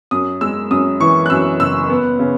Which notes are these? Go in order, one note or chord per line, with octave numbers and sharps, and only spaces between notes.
F#2 D#6
G#3 E6
F#2 D#6
E3 C#6
F#6
F#2 E6
F#1 E6
B3
C#3